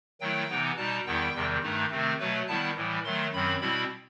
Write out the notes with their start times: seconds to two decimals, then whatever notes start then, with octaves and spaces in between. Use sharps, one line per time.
0.21 D#3 F#3 A3 E4 G5
0.49 C3 E3 B3 D#4
0.77 B2 G3 D#4 A5
1.06 E2 D#3 G3 B3 E4 G5
1.35 E2 C3 D#3 G3
1.63 G2 D#3 A3 D#4
1.91 C3 D#3 A3 C4
2.20 B2 F#3 A3 B4
2.48 D#3 G3 B3 E4 A5
2.76 A2 E3 G3
3.05 D#3 F#3 A3 C6
3.33 F#2 D#3 F#3 C4 B5
3.61 B2 G3 C4 E4 B5